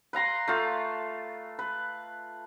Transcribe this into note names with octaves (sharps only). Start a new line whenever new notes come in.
B4 F5 A#5 C6
A3 F4 F5
B4